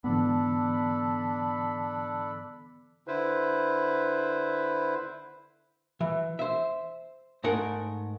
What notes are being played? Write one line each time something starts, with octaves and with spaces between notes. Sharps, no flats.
G#2 D3 E3 B3 D4 A4 B5
D3 E4 B4 C5
E3
C5 E5
G#2 A3 A#4 F#5